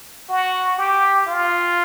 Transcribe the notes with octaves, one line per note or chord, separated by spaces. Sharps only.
F#4
G4
F4